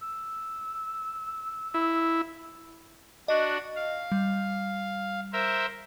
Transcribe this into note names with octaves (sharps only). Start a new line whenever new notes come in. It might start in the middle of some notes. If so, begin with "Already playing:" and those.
E6
E4
D4 F#4 D#5
F5
G3
A#4 C5 E5